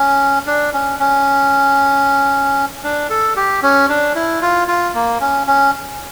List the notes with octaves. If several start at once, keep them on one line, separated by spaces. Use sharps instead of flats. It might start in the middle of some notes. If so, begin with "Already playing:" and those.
Already playing: C#4
D4
C#4
C#4
D4
A4
G4
C#4
D4
E4
F4
F4
A#3
C#4
C#4